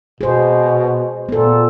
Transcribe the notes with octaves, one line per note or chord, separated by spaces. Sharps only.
B2 G#4 C5
A#2 B3 A4